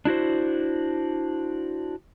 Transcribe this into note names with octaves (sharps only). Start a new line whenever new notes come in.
D4 E4 F#4 C5